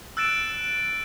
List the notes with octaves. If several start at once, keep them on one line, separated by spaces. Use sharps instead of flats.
E6 F#6 A6 D7 E7